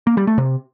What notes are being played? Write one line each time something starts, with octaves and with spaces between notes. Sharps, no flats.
A#3
G3
A3
C3